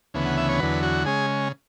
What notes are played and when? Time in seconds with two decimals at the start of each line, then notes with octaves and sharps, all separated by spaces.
0.14 D2 C#3 E3 B3
0.25 F#5
0.38 E5
0.49 C#5
0.60 E2 D3 F#3 B4
0.83 F#4
1.05 C#3 G#3 C#4 G#4